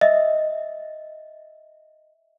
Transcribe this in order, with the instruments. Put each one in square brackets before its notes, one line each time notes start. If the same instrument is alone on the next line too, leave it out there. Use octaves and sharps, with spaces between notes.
[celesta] D#5 E5